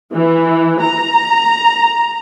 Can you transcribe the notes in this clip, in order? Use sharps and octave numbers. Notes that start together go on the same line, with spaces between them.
E3
A#5